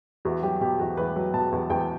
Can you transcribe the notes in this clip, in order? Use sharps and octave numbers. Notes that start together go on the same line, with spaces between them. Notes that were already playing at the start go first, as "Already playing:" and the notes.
E2 F#4
F#3 G4
B2 G4
E2 F#4
E2 B4
F#3
B2 A5
E2
E2 G5